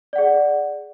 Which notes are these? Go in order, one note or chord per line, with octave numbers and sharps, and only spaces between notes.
G#4 D5 F#5